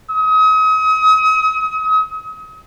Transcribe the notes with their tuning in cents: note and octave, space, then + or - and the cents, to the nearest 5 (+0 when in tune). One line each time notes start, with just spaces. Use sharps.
D#6 +40